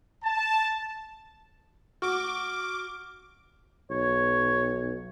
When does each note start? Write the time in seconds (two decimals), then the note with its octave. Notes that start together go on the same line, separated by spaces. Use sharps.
0.24 A5
2.02 F#4 D6 F6
3.90 B1 C#5